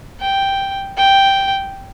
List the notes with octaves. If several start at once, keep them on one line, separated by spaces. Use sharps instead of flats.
G5
G5